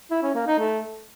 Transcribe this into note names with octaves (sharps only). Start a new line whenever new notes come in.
E4
C#4
A#3
D#4
A3